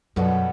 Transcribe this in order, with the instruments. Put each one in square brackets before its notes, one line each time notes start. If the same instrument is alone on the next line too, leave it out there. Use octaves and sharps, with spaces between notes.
[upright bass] F#2 [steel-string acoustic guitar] B2 G3 B3 F#4 A4